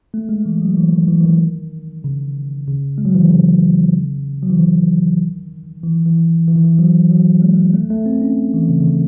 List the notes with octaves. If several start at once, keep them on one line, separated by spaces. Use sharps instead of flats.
A3
G#3
E3
F#3
E3
D#3
E3
E3
D#3
C#3
C#3
G#3
F#3
E3
D#3
C#3
F#3
E3
D#3
E3
E3
E3
D#3
E3
F#3
F#3
G#3
A3
A3
C4
C#4
E3
C#3
C#3
D#3